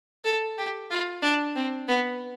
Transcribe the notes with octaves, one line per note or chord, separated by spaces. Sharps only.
A4
G4
F4
D4
C4
B3